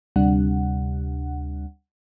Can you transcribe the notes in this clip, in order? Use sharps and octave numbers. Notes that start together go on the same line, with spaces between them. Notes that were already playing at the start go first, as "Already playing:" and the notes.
D2 C3 G3 D4 F#5